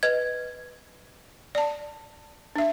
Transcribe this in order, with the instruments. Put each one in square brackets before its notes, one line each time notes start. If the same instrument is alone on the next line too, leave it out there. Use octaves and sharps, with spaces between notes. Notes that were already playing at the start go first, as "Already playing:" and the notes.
[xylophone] B4 D#5 G#6
[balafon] D5 A5
D4 E5